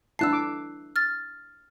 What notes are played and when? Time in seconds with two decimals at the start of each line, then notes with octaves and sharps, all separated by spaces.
0.19 D4 E4 A5 E6 F#6 C7
0.33 D6
0.96 F6 A6